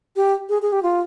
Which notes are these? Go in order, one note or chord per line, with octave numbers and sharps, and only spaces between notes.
G4
G#4
G#4
G4
F4